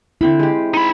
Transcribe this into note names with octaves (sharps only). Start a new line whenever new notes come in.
D3 C4 E4 B5
G#3 G4
D#4 G#5 B5